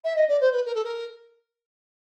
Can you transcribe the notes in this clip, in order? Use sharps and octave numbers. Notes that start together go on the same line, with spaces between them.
E5
D#5
D5
C5
B4
A#4
A4
A#4